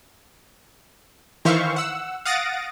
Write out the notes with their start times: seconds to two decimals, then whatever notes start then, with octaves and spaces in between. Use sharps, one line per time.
1.45 D#3 E3 C5 E5 F5 C#6
1.76 F#5 E6
2.25 F5 F#5 D#6 A6 A#6 D7